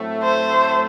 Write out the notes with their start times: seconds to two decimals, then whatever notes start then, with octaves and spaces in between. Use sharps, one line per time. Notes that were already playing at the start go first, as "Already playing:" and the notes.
Already playing: A2 F#3 A3 C4
0.23 C5